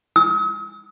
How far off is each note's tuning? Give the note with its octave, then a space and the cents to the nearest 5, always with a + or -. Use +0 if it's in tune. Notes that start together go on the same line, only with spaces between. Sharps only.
D#6 +45